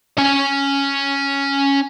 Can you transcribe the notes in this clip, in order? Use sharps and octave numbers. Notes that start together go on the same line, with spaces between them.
C#4 G#5